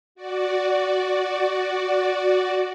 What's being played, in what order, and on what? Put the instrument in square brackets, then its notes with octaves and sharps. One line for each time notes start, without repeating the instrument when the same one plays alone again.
[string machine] F#4 D5